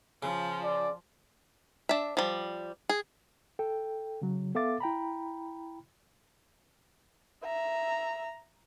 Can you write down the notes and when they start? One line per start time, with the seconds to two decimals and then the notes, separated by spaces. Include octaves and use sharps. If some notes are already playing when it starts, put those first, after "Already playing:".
0.23 C#3 F3
0.63 D5
1.89 D4 E5
2.17 F3 G3
2.89 G#4
3.59 A4 G5
4.22 C#3 F#3
4.55 B3 A4 E5 F5 D6 A6
4.80 E4 G5 A#5 B5
7.44 E5 A#5